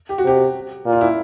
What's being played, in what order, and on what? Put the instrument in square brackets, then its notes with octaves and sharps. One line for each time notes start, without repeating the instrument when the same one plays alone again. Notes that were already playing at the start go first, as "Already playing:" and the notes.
[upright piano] G4
F#4
[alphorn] C3 [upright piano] G4
[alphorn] A#2
[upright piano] F4
E4